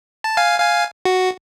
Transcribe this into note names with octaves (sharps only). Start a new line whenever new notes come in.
A5
F5 G#5
F5 G#5
F#4